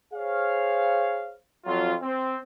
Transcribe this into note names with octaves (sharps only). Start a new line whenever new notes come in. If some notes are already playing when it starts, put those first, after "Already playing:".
G#4 C5 C#5 F5
F2 F#3 F4
C4